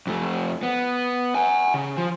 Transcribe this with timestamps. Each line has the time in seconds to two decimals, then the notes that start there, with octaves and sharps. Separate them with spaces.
0.07 F2 A3
0.63 B3
1.35 F#5 G#5
1.74 C#3
1.97 F3